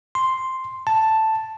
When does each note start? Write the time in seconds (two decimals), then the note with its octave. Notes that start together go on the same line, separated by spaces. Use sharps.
0.15 C6
0.87 A5